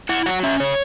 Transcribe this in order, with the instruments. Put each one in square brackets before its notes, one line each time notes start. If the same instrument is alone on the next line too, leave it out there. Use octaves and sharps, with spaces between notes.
[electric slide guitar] E4 F#5
F#3 F#5
C#4 E5
C#3 C#5